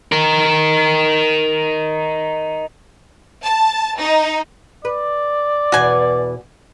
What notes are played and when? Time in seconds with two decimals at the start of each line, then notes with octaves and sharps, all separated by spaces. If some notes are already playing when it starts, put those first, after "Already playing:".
0.12 D#4 A#4
3.44 A5
4.00 D#4
4.85 B4 D5
5.72 E2 B2 E3 F#4 G#5